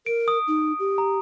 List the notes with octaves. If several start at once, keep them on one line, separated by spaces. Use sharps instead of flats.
A#4 D7
D#6
D#4
G4
A#5